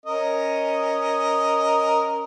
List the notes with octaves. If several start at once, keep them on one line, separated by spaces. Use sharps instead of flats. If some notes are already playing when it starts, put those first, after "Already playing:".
C#4 A#4 D#5